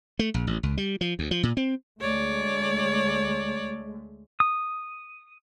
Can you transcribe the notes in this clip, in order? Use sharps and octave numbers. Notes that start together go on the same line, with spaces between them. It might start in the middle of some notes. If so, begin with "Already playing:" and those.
A3
A#1
A1
C#2
G3
F3
D2
F3
A#2
C4
D2 G#3 A3 C#5 D5
D#6